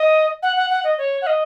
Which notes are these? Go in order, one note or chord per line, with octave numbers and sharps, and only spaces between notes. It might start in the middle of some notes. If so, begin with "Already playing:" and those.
Already playing: D#5
F#5
F#5
F#5
D#5
C#5
F#5
D#5